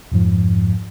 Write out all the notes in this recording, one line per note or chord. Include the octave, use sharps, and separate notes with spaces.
F2 G#2 F3